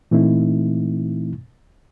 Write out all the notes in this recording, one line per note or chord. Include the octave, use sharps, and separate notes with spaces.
A#2 E3 A3 C4 D#4 E4